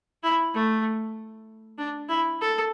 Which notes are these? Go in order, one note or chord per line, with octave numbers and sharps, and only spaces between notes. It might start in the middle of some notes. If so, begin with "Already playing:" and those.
E4
A3
D4
E4
A4